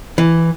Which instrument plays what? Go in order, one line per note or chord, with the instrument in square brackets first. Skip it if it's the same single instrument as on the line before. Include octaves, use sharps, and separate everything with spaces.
[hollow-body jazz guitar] E3